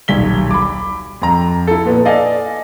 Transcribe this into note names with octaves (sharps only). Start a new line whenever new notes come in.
D#1 B1 B6 G7
B5 D6
F2 A#5
E4 A4
A#2 B3
A4 D5 D#5 F5 G#5